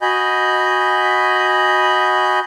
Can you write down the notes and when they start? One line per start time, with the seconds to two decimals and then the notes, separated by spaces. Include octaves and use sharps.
0.02 F#4 D#5 G#5 B5 G6